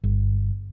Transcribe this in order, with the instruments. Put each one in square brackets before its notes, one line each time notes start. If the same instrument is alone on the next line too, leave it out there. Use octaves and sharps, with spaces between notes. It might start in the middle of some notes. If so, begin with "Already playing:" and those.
[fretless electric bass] G1